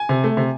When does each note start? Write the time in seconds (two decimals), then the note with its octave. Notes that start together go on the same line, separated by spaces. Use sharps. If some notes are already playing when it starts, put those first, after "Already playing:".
Already playing: G#5
0.09 C3
0.24 A3
0.37 C3